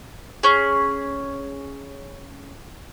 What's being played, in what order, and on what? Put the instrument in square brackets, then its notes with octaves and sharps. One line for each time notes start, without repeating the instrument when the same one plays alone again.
[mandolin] C#4 G#4